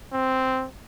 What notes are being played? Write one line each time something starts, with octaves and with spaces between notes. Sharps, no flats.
C4